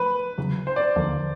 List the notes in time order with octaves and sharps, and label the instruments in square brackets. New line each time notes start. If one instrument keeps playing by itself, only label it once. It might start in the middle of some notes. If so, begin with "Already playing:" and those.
Already playing: [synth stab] F3 A3 [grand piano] B4
[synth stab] E2 C#3 F#3
[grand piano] C5
D5
[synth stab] D#2 D3 F3 A#3